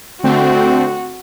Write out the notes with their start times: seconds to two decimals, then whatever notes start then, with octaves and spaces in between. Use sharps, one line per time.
0.23 D3 A3 C4 F#4